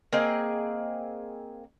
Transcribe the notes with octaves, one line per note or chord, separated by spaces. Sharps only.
A#3 C4 G#4 D#5